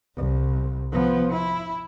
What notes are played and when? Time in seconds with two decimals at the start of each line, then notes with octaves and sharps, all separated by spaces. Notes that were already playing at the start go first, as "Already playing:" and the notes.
0.16 C2
0.92 F3 B3
1.32 E4